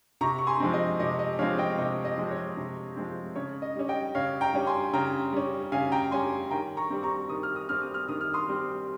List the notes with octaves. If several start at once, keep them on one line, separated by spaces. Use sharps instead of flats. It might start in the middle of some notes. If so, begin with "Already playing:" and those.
C3 A#5 C#6
C#6
G#5 C6
F3 G#3 C4
D#5
C3 D#5
D#5
F3 G#3 C4 C#5 F5
D#5 G5
C3 D#5
D#5
F3 G#3 C4
C#5
C3
F3 G#3 C4
C#3 C#5
D#5
G3 C#4
D#5 G5
C#3 C#5 F5
G5 A#5
G3 C#4
G#5 C6
C#3 G5 A#5
G3 C#4
C#3 F5 G#5
G5 A#5
G3 C#4 G#5 C6
D#3 G5 A#5
A#5 C#6
G3 C4
A#5 C#6
D#3 D#6
F6
D#6
G3 C4 F6
D#6
F6
D#3 D#6
F6
C6 D#6
G3 C4